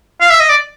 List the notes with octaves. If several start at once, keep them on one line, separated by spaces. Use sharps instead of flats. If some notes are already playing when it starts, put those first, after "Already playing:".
F5
E5
D#5
D5